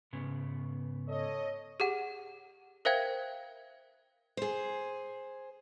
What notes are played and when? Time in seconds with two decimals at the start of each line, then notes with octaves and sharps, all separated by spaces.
0.13 G#2 C#3 B3
1.09 A4 C#5 D#5
1.80 G4 G#4 F#5
2.85 A#4 C5 E5 F5 G5 G#6
4.37 G#4 C5